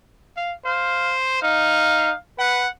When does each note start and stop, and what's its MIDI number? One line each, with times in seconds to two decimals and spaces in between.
0.37 0.54 77
0.65 1.41 72
0.65 1.12 77
1.42 2.11 63
1.42 2.14 77
2.39 2.63 71
2.39 2.69 78